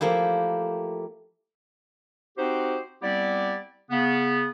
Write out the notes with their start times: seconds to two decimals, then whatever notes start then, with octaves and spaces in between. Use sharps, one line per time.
0.01 F3 A3 A#3 E4 G4
2.37 C4 D#4 F#4 G4 C5
3.02 G3 B3 C4 E4 G4 D5
3.91 C#3 B3